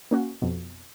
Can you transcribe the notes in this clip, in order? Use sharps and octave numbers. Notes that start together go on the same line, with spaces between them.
A#3 C#4 F#4
F2 B2